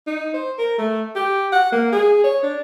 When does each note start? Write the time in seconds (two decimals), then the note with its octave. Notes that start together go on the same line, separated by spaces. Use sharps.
0.07 D#4
0.34 C5
0.58 A#4
0.78 A3
1.16 G4
1.52 F#5
1.72 A#3
1.92 G#4
2.24 C#5
2.43 D4